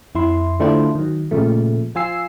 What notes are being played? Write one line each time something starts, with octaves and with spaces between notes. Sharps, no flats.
F2 E4 C6
D3 A3 D4 E4 F4 C5
D#3 F#3
A#2 C#3 F3 A3
F3 F4 G#5 E6 C7